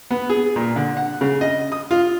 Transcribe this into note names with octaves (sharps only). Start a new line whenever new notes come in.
B3
G#4
A#2
D3
F#5
C#3
D#5
D#6
F4